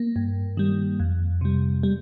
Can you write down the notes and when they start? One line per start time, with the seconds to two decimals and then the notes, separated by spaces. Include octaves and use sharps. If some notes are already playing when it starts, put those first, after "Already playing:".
Already playing: A#3
0.16 G2
0.57 D#3 G3
1.00 F2
1.41 C3 G3
1.83 G3